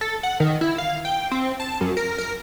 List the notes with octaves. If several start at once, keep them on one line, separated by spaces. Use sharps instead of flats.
A4
F#5
D#3
E4
F5
G5
C4
A5
F#2
A#4
A#4